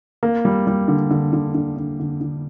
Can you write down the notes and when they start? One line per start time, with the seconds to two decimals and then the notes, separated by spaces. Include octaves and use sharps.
0.23 A#3
0.45 G3
0.67 G3
0.88 D3
1.11 D3
1.33 D3
1.54 D3
1.76 D3
2.00 D3
2.21 D3